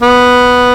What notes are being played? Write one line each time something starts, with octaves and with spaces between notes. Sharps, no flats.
B3